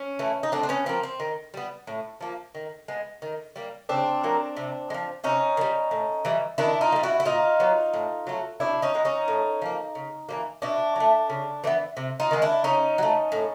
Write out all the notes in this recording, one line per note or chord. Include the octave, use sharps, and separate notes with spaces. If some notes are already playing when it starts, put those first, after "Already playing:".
Already playing: C#4
E3 A3
D#4
A2 C4 D4
D4
B3 C#4
F3 A#3 C4
C4
D#3
G3 B3
A2
F3 A#3
D#3
G#3 B3
D#3
G3 A#3
C#3 C4 D4
F#3 A#3
C3
G#3
F3
C3 C#4 D#4
D#3
G3
A2
E3 G3
D#3 D4 E4
D#4 F4
A#3
G3
E4 F#4
E4
A#2 D#4 F4
F#3 B3
A2
F#3 A3
B2 D4 E4
C#4 D#4
G#3 B3
C#4 D#4
A2
F3 A#3
C#3
E3 G3 A#3
B2 D4 E4
F#3
A3
C#3
E3 G#3 B3
C3
D#4 F4
D#3 G#3 B3
D4 E4
C#3 C#4 D#4
F#3
A3
A2